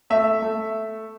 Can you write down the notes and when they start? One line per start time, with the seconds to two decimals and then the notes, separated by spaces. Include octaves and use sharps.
0.10 A3 E5
0.42 A3